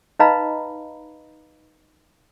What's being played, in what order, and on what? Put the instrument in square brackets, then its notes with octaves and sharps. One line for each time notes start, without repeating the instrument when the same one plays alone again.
[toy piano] D#4 B4 D#5 F5 A#5 B5